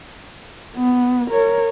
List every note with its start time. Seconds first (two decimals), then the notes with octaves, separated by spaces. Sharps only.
0.76 B3
1.30 A#4 C#5